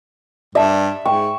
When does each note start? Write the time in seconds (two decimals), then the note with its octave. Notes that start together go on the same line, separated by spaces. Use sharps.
0.55 G2 D5 E5 A5
1.06 G#2 G5 C#6